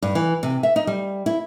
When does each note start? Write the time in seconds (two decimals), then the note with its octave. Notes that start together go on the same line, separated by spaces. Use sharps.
0.02 G2
0.15 E3
0.43 C3
0.63 E5
0.76 D#4
0.87 G3
1.26 E4